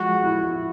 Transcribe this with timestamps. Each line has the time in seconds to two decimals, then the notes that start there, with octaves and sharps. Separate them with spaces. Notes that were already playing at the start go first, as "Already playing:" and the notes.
Already playing: F3 G#3 F#4
0.24 E4